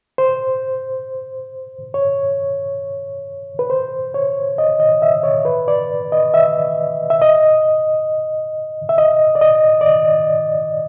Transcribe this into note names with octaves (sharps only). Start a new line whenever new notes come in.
C5
C#5
B4
C5
C#5
D#5
D#5
E5
C#5
B4
D5
D#5
E5
E5
D#5
E5
D#5
D5
D#5
D5
D#5